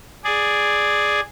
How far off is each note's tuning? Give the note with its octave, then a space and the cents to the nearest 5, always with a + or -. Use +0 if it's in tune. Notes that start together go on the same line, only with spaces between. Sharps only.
G#4 +0 D5 +5